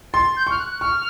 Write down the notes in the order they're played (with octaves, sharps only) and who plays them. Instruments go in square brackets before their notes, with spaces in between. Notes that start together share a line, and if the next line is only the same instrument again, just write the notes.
[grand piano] C6 [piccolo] A6
[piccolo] G6
[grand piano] C#6 [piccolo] F6
[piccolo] F#6
F#6
[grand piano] C#6 [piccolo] F6